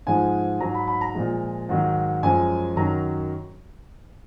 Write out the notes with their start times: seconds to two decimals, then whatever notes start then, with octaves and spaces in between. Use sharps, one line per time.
0.07 G#2 F3 G#3 G#5
0.60 G#2 F#3 A#5
0.74 B5
0.88 B5
1.01 A#5
1.15 A#2 F3 G#3
1.69 G#2 D#3 F#3
2.23 F#2 F3 G#3 G#5
2.76 F#2 D#3 F#3 A#5